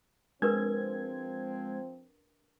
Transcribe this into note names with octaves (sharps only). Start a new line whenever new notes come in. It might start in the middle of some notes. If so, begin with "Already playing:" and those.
F3 G#3 C4 D4 A#4 B4 G#6